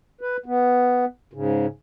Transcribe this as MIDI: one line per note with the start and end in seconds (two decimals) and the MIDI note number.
0.21 0.37 71
0.46 1.05 59
1.33 1.66 44
1.33 1.66 49